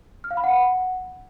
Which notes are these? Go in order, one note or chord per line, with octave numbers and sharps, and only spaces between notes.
F6
F5
B5
F#5